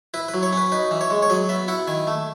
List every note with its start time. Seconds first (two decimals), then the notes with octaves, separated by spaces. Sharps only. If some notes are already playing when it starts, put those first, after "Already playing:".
0.14 E4 B4
0.28 B4
0.34 F#3
0.43 C#5
0.53 C#4 B4
0.72 D#4 B4
0.91 E3
1.01 C#5
1.10 G#3
1.22 C#5
1.30 F#3 D#5
1.49 B3 E5
1.68 E4 F#5
1.88 D#3 G#5
2.07 A3